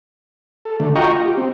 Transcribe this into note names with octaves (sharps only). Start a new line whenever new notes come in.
A4
D3 A3
F4 F#4 D#5 G5 A#5 C#6
F4
G4
C4